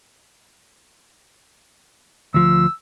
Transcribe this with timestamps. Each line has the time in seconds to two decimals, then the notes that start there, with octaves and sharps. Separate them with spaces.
2.34 D2 F3 E6